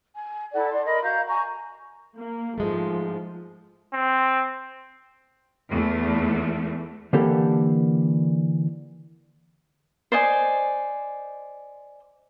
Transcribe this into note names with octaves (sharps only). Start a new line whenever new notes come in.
G#5
E4 A4 D5 F#5
D5 C6
A#4 D#5 B5
F#4 F5 A#5 G6
G#5 A#5 C#6
A#3
G#2 F3 G#3 A3
C4
E2 A3
D3 E3 A#3 G4 A4
C5 D5 D#5 G#5